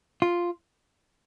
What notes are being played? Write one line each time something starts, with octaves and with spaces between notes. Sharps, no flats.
F4